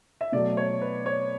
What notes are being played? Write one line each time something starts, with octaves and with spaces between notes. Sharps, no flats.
E5
B2 F#3 A3 D5
C#5
B4
C#5